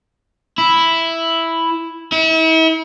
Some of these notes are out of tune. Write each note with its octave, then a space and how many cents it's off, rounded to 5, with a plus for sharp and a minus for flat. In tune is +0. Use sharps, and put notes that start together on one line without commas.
E4 +0
E4 -40